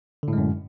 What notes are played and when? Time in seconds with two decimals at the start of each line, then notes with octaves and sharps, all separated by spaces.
0.23 D3
0.28 A2
0.33 G#3
0.38 F#2